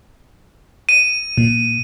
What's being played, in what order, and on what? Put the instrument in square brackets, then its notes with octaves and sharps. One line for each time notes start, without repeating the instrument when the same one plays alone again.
[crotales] D#7
[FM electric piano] A#2